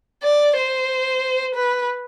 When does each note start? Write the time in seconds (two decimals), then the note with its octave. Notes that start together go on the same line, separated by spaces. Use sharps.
0.23 D5
0.57 C5
1.55 B4